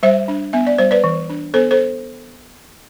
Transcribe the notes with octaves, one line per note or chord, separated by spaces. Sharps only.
G3 C5 E5
D4
B3 E5
D5
G3 C5
B4 D5
E3
D4
B3 A4 C5
A4 C5